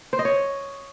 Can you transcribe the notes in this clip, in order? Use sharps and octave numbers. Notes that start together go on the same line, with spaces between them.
C5
D#5
C#5